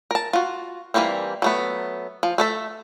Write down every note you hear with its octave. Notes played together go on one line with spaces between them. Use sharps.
A#4 A5
F4 F#4
E3 F#3 G3 A#3 C4
F#3 A3 B3
F3
A3 A4 E5